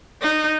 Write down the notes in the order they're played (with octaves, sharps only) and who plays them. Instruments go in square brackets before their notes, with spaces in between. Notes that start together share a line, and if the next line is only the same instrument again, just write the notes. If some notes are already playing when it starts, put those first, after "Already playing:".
[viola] D#4